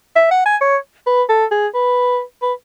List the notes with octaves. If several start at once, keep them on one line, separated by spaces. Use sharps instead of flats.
E5
F#5
G#5
C#5
B4
A4
G#4
B4
B4